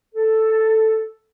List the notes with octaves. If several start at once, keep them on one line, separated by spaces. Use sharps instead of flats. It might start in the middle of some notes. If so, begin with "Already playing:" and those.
A4